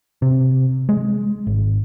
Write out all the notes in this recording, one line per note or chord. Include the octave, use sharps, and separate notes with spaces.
C3
G#3
G#1